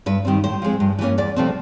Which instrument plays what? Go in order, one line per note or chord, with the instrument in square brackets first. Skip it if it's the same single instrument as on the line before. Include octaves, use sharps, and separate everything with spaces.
[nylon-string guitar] G2 B4
D#3 G3 C4
A2 C5
F3 G#3 C4
G2
E3 G3 A#3 C#4
E2 D5
C3 F3 A3 C4